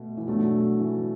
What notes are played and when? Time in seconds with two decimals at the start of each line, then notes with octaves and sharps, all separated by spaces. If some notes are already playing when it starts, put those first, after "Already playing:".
Already playing: B2 A3
0.17 E3
0.27 B2 F#3 A3 D4
0.79 E3